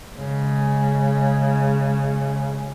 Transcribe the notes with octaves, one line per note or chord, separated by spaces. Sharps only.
C#3 G#3